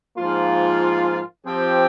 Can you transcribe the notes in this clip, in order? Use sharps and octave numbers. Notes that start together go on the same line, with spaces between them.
G#2 F3 A#3 F4
F3 C4 G4